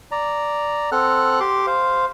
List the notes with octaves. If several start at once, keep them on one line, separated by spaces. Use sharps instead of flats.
D5 A#5
C4 A4 F#5 F6 F#6
G4 C6 D6
C5 F5